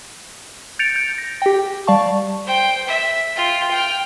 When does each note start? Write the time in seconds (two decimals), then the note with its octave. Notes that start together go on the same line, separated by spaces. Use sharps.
0.79 G6 A6 C#7 D7 F7
0.96 G6
1.18 A#6
1.42 G4 G5
1.87 G3 D5 F5 A5 C#6
2.46 C5 G5
2.87 E5
3.36 F4 G5
3.71 G5 F6